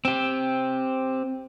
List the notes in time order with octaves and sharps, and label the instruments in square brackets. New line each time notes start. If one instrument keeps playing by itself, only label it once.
[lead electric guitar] C4 G4